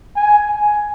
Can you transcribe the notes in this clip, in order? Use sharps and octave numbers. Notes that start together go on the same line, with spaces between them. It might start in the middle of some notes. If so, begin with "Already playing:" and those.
G#5
G#5